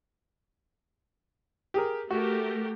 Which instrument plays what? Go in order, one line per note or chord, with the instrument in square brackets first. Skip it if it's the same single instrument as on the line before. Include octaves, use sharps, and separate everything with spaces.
[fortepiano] G4 G#4 A#4
[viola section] A3 G4 A#4 [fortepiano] F#4